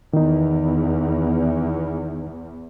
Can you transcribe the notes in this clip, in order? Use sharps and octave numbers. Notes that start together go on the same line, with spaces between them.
E2 D#3 D#4